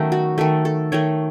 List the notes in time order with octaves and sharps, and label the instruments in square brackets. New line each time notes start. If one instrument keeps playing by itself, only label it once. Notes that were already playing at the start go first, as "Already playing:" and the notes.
Already playing: [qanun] D#3 F#3 A3 C#4 D#4
F#4
D#3 A3 A4
A4
D#3 A3 C#5